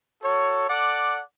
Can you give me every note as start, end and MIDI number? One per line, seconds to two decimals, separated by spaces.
0.22 0.65 66
0.22 0.65 69
0.22 0.65 73
0.68 1.21 69
0.68 1.21 74
0.68 1.21 78
0.68 1.21 86